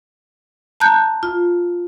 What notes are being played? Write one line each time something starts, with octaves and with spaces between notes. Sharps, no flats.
A5 A#5 F#6 G6
F4